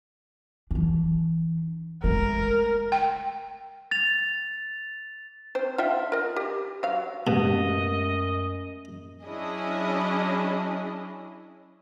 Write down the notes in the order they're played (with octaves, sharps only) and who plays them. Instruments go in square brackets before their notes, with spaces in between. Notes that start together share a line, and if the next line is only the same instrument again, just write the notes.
[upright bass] E3 D4
[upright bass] G#3 A3 [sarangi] A#4
[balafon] G5
[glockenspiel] A6 F7
[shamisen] C4 C5
F4 E5 G5
A#4 D#5
G4
F#3 F5
[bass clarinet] F#2 [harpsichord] B2 [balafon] G#3 A3 G4 [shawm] D#5
[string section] F#3 C#4 D4 E4 G#4 D#5